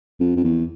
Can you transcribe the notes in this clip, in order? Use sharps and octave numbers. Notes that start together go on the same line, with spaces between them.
F2
F2
E2